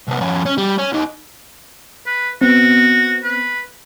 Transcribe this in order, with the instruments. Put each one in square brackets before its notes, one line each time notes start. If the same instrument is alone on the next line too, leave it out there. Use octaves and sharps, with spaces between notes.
[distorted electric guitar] C2 B3
F2 C#4
C#4
G3
C#4
D#2 D#4
[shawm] B4
[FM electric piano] B3 C4 [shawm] F#4
[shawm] B4